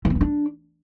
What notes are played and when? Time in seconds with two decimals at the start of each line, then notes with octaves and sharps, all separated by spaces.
0.05 E3
0.10 C4
0.15 B3
0.21 D4